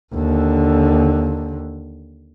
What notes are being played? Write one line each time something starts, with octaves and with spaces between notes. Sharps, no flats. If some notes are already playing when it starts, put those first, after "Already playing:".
D#2 D3